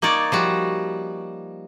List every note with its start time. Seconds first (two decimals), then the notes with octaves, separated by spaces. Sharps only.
0.02 A#3 D#4 C#5 D5
0.32 F3 G3 F#4